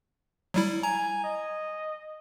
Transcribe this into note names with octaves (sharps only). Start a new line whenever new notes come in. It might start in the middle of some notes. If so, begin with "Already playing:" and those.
F#3 G3 E4
G#5 A#5
D#5